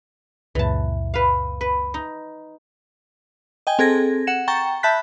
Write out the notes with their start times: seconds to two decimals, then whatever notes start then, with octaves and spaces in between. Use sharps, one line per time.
0.55 C#2 F#2 A#2 E3 A5
1.14 B4 F5
1.61 B4
1.94 D#4
3.67 D#5 G5 G#5
3.79 C4 G#4 A4 G#6 A#6
4.27 F#5 C#7 E7
4.48 G5 A#5 C#6 A6
4.83 E5 A5 B5 F#6 G6 B6